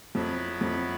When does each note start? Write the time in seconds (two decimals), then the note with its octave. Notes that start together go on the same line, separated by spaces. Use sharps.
0.15 F2 F#3 B3 E4
0.61 F2